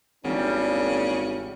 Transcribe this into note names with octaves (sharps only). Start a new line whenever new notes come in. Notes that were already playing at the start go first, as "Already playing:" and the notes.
G#1 E2 C#3 G3 A#3 D4